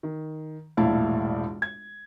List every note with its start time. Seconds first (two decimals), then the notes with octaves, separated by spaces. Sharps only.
0.03 D#3
0.77 E1 A#1 A2 E4 F5 A5
1.62 G#6